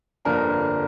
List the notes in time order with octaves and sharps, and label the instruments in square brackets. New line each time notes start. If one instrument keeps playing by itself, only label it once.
[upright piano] G1 F2 D3 A#3 D4 A#4